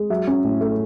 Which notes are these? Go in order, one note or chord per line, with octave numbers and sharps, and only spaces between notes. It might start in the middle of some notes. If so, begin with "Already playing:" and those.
Already playing: G#3
F#3 E5
C#4
A2
A3